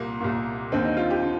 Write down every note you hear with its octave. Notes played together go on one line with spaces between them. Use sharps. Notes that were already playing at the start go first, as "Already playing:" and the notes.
Already playing: C2 A#2 A#3
C2 A#2
D#2 D3 C4
D#4
F4
G4
D3